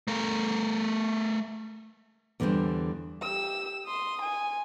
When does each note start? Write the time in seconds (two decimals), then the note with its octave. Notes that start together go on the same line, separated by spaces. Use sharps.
0.08 A3 A#4
2.40 E2 D3 E3 G3 E4 C5
3.22 G4 E6
3.86 C6 D#6
4.22 G#5